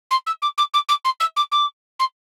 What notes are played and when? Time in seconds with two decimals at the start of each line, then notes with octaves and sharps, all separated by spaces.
0.10 C6
0.26 E6
0.42 D6
0.57 D6
0.73 D6
0.88 D6
1.04 C6
1.20 E6
1.36 D6
1.51 D6
1.99 C6